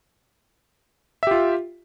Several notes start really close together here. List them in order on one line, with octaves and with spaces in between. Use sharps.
E5 G4 F4